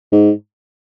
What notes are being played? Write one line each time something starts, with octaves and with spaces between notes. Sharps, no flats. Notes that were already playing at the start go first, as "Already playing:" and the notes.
G#2